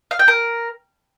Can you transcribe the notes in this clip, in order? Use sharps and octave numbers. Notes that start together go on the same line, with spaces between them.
F5
G5
A#4